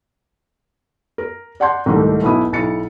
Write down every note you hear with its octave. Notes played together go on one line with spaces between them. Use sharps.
A#4
D5 F#5 A5 C6 G6
C2 G#2 D#3 A3
B1 B2 B3 E4 D#6
B1 E4 A6 C#7